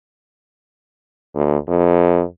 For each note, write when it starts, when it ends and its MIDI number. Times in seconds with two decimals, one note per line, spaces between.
1.35 1.57 38
1.68 2.24 41